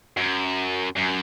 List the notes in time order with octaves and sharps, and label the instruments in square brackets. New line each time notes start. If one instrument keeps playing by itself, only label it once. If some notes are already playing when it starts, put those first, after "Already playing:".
[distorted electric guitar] F#2
F#2